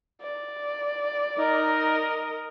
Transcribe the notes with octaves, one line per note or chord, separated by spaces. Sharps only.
D5
D#4 A#4 D#5